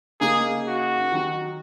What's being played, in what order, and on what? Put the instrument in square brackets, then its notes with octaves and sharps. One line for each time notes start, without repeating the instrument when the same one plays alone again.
[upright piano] C#3 A#3 D#4 A#4 [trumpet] G#4
[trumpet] F#4
[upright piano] D#3 F#3 D#4